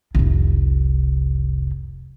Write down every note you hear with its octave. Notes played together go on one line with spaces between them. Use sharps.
F1 C2